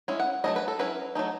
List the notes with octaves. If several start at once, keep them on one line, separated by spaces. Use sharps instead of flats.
G#3 C#4 E4
F#5
F#3 A3 C#4 E4 D#5
B4
A4
F#3 C#4 E4 B4
F#3 A3 D#4